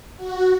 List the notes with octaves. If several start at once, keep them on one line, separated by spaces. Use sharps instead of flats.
F#4